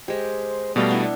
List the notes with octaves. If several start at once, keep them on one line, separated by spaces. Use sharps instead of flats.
G#3 G4 C5
B2 G3 A3 A#4 D5 F5 G5
B3 D4 E4